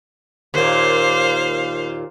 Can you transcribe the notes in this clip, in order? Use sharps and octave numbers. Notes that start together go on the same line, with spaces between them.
D#2 A#2 C5 F5